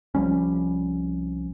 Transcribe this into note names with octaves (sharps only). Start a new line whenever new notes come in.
C2 F3 G3 C#4